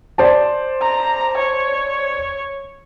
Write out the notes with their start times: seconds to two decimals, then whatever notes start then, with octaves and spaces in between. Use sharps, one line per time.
0.18 C5 D5 A5
0.81 A#5
1.37 C#5